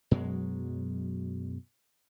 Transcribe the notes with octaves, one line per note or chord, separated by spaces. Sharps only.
F#2 B2 F#3 G#3